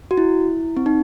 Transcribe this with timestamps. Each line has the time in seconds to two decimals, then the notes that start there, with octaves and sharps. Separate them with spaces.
0.11 F#4
0.17 E4
0.77 C4
0.86 D#4